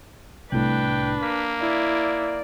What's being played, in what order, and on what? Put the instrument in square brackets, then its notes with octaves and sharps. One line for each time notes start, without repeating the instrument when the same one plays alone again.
[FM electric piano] C2 A2 [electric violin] D4 [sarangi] B4 [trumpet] G5
[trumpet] A#3 [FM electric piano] B6
[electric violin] E4 [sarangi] D5